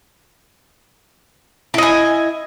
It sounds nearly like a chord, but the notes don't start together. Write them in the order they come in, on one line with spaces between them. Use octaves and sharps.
E4 D#5 G#5